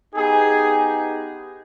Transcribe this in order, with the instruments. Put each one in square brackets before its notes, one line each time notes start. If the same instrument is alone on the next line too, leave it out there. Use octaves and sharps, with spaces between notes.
[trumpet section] B3 D#4 G4 G#4